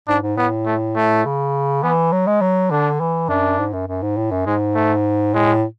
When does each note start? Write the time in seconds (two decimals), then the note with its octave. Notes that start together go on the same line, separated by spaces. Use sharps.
0.08 G#2 D4
0.22 G#2
0.37 A2 B3
0.66 A3
0.96 A3
1.25 C#3
1.83 E3 B3
2.12 F#3
2.27 G#3
2.41 F#3
2.71 D3 D4
3.00 E3
3.29 F#2 D4
3.59 G#2
3.73 F#2
3.87 F#2
4.02 G#2
4.17 A2
4.31 F#2
4.46 G#2 G#3
4.75 A3
5.34 A2 G#3